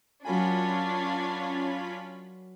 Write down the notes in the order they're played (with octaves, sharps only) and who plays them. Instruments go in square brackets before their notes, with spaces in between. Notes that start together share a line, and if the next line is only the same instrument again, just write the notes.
[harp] F#3 A#4 G#5 [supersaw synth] C#4 F4 B5 [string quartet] D4 C#5